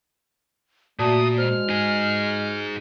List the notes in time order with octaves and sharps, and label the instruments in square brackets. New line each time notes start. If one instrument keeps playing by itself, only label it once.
[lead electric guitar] A#2 [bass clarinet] A3 [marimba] F#4 D5 A5 [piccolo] D#6
[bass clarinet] G#3 [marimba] C5 [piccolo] F6
[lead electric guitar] D#4 G#4